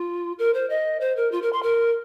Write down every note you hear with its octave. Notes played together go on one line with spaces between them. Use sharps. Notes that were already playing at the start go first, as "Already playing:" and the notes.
Already playing: F4
A#4
C5
D#5
C5
A#4
F4
A#4
C6
A#4